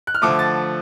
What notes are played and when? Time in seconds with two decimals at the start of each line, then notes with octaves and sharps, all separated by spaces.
0.07 F#6
0.15 F6
0.22 D3 F3 A3 D6
0.39 A6